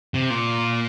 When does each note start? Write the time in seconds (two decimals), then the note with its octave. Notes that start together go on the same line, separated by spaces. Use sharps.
0.14 C3
0.30 A#2